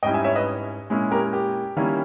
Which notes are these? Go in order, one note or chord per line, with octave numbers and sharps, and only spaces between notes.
G#2 G3 C#4 E4 D#5 G5
E5 G#5
C#5 E5
B4 D#5
A#2 G#3 C#4 E4
G4 A#4
G4
D#3 G3 A#3 C#4 E4